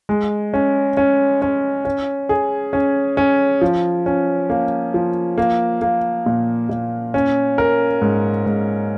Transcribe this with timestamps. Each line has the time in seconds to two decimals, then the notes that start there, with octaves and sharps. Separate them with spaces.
0.09 G#3
0.54 C#4
0.97 C#4
1.42 C#4
1.85 C#4
2.29 G#4
2.73 C#4
3.17 C#4
3.61 F3
4.06 C#4
4.50 A#3
4.94 F3
5.38 A#3
5.82 A#3
6.26 A#2
6.69 A#2
7.14 C#4
7.58 A#4
8.02 G#2
8.46 G#2